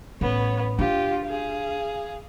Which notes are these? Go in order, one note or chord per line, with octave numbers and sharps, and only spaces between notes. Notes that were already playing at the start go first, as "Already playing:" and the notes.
A1 B3 C#5
D4 F4 G4
G#4 F5